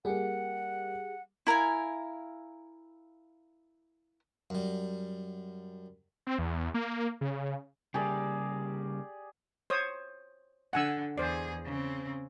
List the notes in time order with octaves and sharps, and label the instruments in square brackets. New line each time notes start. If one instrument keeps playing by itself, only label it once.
[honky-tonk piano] G3 A#3 [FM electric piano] G4 G#4 [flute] F#5
[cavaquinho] E4 A#4 F5 G#5
[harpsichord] F#2 G3
[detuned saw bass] C4
E2
A#3
C#3
[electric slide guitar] C#3 G3 A#3 [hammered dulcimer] G4 G#4 D5
[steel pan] C5 C#5 D#6
[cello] D3 [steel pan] F#5 G#5 E6
[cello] E2 G#4 [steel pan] C5 D5
[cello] C#3 C4